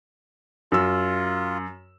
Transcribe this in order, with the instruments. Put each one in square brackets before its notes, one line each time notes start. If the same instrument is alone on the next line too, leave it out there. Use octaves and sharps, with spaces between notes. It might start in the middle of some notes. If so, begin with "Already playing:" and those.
[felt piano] F#2 E6 [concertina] F4